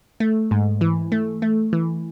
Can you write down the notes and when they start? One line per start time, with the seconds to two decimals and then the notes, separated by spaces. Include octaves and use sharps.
0.20 A3
0.51 G#2
0.81 E3
1.12 A3
1.42 A3
1.73 E3